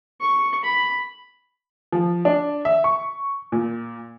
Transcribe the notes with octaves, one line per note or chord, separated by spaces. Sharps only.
C#6
B5
F3
D4
E5
C#6
A#2